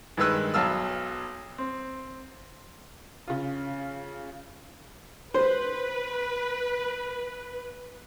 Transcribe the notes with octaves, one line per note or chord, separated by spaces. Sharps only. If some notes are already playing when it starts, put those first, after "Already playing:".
G2 D#3 G#3 B4 E6 F#6
B1 F#3 F5 A5 E6 F6
C4
C#3 F4
B4 C5